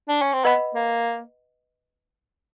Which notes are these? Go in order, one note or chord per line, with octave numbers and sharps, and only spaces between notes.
D4
C#4
C4
B3 B4 D#5 F#5 B5
A#3